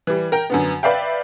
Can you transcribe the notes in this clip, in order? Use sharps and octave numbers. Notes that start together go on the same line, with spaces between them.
E3 G3
A#4 G5
F#2 D3 B3
B4 D5 E5 F5 G5